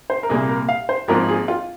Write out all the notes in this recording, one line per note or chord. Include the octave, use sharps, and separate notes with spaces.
C5
A#4
C2 A#2 A#3 G#4
A#4
F5
C5
G#1 G#2 F3 A#3 A#4
G#4
F4